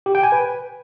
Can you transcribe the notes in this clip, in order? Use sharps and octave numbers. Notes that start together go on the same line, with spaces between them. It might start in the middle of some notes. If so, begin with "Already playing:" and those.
G4
G5
G#5
B4